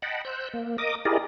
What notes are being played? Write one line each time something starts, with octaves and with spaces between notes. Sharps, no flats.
D#5 F#5 G5 A5 B5
C5 E6 F#6 G6
A#3
A#4 D#5 D6 D#6
E4 G4 G#4 A#4 D5 D#5